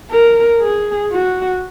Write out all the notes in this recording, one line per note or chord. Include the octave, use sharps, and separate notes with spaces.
A#4
G#4
F#4